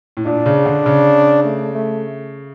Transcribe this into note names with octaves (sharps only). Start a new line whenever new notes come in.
A2
A#2 D4
C#3
D3
C#3
A3
A3